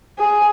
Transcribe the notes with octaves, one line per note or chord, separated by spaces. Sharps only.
G#4